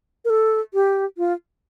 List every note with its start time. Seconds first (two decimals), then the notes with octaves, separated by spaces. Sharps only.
0.25 A#4
0.30 A4
0.74 G4
1.18 F4